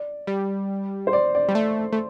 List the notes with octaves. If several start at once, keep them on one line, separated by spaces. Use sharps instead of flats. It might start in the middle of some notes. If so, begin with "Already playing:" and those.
Already playing: D5
G3
C5
D5
D5
G3
A3
A3